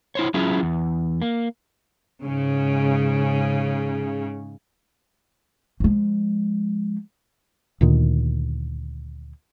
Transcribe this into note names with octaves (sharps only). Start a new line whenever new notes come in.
E4 C5 C#5
F#3 C#4 E4 F4 G#4
E2
A#3
G#2 C#3
F3 G#3
D2 A#2 D#3